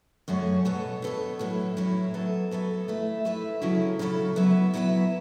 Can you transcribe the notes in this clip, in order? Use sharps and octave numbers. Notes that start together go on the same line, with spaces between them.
F#2 C#3 F#3 A3 C#4
B2 B3 A4 C#5
B2 B3 A4 C#5
A2 F#3 C#4 E4
A2 F#3 C#4 E4
F#3 B3 A4 E5
F#3 B3 A4 E5
A3 E4 B4 E5
A3 E4 B4 E5
C#3 F#3 C#4 E4 A4
C#3 F#3 C#4 E4 A4
F#3 B3 E4 B4 E5
F#3 B3 E4 B4 E5